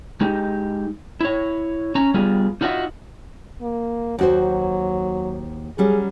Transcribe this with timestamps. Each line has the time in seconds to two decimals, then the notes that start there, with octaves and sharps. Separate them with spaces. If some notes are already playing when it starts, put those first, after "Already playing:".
0.21 G#3 D#4 G4
1.21 E4 C#5
1.95 C#4 A#5
2.14 G3 B3 F4 G#4
2.61 D#4 F4 F#4 A#4 D#5 E5
3.62 A#3
4.19 D#2 F#3 F#4 C5
5.78 F#3 G3 C#4 G#4